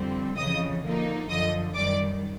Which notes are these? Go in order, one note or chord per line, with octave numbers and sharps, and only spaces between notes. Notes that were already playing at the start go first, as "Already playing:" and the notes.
Already playing: F2 D3 G3 C4
F2 C#3 E3 D#5 D#6
D3 F3 A#3 D#4
F#2 D3 F3 D#5 D#6
F#2 D#3 G3 D5 D6